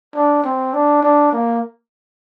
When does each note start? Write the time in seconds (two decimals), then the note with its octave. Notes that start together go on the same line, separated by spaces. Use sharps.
0.14 D4
0.44 C4
0.74 D4
1.02 D4
1.33 A#3